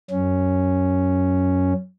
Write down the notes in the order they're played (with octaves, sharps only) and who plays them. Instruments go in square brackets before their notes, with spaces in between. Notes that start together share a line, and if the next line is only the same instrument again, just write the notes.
[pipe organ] F#2 C#4